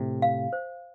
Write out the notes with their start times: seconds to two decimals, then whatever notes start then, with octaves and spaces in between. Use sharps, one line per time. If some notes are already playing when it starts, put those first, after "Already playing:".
Already playing: A2 C3
0.22 F5
0.53 C5